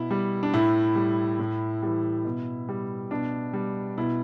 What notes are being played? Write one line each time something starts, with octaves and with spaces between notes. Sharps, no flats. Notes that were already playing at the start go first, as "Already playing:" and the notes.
Already playing: B2 E4
G3
D4
A2 E4
G3
A2
E3 G3
B2
G3
B2 D4
G3
B2 E4